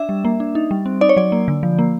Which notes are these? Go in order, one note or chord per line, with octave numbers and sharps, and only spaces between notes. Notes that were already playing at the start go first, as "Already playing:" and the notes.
Already playing: D4 E5
G3
A#3
D4
D#4
G3
C4
D#4 D5
C#5
F#3 D5
A#3
D3
F3
A#3